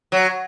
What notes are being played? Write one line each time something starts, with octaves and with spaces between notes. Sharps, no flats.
F#3